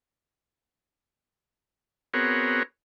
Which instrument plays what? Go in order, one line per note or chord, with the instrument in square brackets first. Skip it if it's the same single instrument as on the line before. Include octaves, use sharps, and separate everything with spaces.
[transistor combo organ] B3 C4 F#4 G#4 A#4 C#5